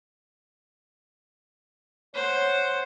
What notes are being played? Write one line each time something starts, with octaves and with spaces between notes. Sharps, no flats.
C5 C#5 F#5